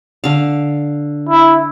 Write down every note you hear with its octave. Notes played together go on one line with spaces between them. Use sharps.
D3 F5
E4